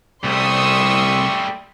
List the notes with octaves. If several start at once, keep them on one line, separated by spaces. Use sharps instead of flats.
C2 G3 A3 C6 C#6 D#6 E6